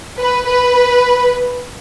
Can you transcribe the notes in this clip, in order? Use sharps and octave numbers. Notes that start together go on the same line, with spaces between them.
B4
B4